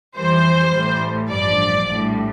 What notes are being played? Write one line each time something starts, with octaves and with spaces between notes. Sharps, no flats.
F2 E3 G3 C5
A1 A2 E3 G3
A1 G2 F3 D5
A#1 A2 G3